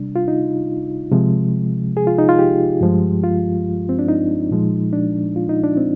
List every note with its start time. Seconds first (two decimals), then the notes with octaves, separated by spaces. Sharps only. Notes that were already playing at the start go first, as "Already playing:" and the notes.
Already playing: C3 G3 D4
0.16 F4
0.28 D#4
1.12 C3 F3 G#3
1.97 G#4
2.07 F4
2.18 D#4
2.29 F4
2.39 G4
2.81 G2 F3 G#3
3.23 F4
3.89 C4
3.99 D4
4.08 D#4
4.51 A#2 F3 G#3
4.93 D4
5.36 F4
5.49 D#4
5.64 D4
5.77 C4